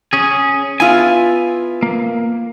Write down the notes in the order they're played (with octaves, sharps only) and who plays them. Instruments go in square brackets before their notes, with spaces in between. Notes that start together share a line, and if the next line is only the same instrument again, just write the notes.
[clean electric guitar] C#4 G#4
[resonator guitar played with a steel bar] B3 E4 F4 [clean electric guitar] G#5
[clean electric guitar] A#3